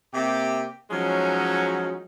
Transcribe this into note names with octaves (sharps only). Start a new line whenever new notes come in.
C3 A#3 G4
F3 F#3 G#3 C#4 D#4